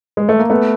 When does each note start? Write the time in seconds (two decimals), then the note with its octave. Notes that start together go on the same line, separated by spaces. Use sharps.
0.17 G#3
0.29 A3
0.39 A#3
0.50 A3 B3